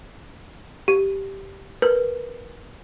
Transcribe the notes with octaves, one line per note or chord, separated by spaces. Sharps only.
G4
A#4 B4